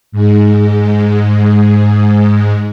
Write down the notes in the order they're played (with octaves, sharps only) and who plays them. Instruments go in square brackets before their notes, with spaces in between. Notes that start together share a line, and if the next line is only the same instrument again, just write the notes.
[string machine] G#2 G#3